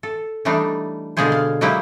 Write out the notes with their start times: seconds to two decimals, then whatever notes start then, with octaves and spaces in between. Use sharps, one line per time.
0.03 A4
0.45 E3 G3 A3 D4 D#4
1.17 B2 D3 G#3 A#3 G#4 C5
1.32 F5
1.61 F#3 G#3 A#3 E4 G4 C5